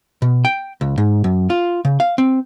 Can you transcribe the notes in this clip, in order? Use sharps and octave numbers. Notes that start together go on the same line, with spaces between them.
B2
G5
C#2
G#2
F#2
F4
C#3
F5
C4